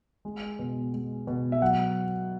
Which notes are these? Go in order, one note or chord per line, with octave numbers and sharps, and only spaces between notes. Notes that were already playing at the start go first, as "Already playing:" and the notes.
G#3
B2
G#3
B2
E5
F#3 F#5